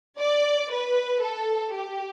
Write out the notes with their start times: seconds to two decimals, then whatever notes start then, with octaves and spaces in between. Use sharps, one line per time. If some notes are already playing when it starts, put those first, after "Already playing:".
0.19 D5
0.70 B4
1.21 A4
1.73 G4